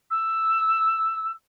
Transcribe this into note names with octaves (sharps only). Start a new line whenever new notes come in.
E6